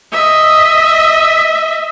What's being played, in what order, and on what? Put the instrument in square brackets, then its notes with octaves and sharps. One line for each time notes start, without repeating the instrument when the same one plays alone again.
[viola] D#5 E5